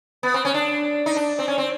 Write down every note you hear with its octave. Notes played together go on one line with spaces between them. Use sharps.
B3
C4
C#4
D4
D#4
D4
C4
C#4
C4